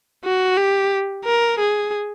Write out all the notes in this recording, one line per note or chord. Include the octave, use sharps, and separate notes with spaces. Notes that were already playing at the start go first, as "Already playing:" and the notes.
F#4
G4
A#4
G#4